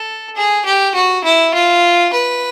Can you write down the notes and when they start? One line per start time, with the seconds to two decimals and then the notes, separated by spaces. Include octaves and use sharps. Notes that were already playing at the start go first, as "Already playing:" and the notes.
Already playing: A4
0.35 G#4
0.65 G4
0.94 F#4
1.24 E4
1.54 F4
2.13 B4